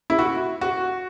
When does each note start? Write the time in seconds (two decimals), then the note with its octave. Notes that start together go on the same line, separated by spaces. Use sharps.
0.10 E4
0.19 F#4
0.61 F#4